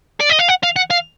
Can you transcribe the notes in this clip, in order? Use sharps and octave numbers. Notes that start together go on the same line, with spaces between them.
D5
D#5
F5
F#5
F5
F#5
F5